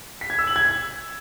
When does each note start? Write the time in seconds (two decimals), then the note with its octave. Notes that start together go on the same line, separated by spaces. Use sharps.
0.21 B6
0.30 G#6
0.39 E6
0.47 F#7
0.56 G#6